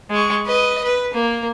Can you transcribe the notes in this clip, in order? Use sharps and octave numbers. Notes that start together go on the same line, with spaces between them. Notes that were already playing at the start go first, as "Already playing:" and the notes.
G#3 C#6
B4 D#5
B4
A#3